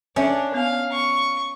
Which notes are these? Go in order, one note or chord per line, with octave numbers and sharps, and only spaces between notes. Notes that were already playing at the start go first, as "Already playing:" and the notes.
C#4 D4 A4 E5 G#5
B3 F5
C#6